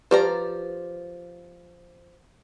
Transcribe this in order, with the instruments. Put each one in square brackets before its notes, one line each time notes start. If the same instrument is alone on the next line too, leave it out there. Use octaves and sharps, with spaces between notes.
[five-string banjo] F3 D5 A#5 [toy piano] G4 B4